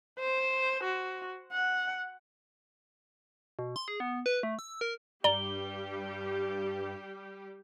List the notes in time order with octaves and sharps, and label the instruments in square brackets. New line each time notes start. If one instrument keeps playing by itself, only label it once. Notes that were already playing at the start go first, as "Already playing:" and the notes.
[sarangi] C5
F#4
F#5
[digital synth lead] B2
C6
G#4
B3
B4
A3
E6
A#4
[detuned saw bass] G2 [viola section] G3 G4 [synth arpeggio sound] D5 A#5 [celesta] G7